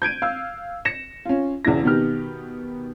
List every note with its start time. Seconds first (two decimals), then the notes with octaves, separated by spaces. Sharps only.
0.02 G6 G#6 D7 D#7
0.22 F5 E6
0.85 A#6 C#7 E7
1.25 C#4 F4
1.65 E1 E2 C#3 E4 A#6
1.83 B2 D#3 B3 D#4 G4 F6